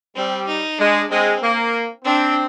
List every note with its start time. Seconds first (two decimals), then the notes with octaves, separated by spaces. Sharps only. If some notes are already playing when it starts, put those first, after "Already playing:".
0.15 G3 C4
0.47 D#4
0.79 G#3 D4
1.10 G#3 C4
1.42 A#3
2.05 C4 D4